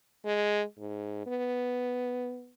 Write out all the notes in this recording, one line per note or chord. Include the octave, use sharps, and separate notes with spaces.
G#3
G#2
B3